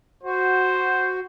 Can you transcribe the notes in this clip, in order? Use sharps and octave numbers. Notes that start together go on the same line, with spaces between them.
F#4 C5